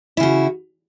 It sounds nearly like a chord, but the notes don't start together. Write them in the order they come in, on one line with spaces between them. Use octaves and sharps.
E4 C#3 F#4